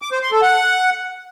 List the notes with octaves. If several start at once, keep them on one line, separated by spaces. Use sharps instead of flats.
D6
C5
C6
A4
F#5